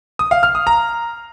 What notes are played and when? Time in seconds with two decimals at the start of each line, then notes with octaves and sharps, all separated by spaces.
0.19 D#6
0.31 F5
0.43 F6
0.55 D#6
0.67 A#5